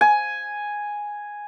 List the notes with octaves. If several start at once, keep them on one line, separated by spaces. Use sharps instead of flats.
G#5